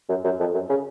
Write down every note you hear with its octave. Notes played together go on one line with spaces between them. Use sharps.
F#2
F#2
F2
F#2
C#3